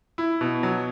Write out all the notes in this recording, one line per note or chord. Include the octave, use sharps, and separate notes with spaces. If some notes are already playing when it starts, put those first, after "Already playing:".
E4
B2
F#3